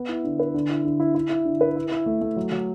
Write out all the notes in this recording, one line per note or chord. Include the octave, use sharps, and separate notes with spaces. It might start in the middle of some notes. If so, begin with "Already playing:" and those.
Already playing: B3
E4
D3
B4
D3
E4
D3
E4
E4
E4
D3
B4
E4
E4
A3
A3
F#3
F#3